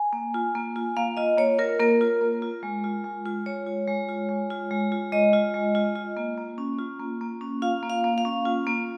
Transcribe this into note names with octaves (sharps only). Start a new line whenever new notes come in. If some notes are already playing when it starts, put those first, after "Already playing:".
Already playing: G#5
A#3
F4
A#3
F4
A#3 F5
F4 D#5
A#3 C#5
F4 A#4
A#3 A#4
F4
A#3
F4
G#3
F4
G#3
F4
G#3 C#5
F4
G#3
F4
G#3
F4
G#3
F4
G#3 D#5
F4
G#3
F4
F4
A#3
A#3
C#4
F4
A#3
A#3
C#4
F4 F5
A#3
F5
A#3
F5
C#4
F4
A#3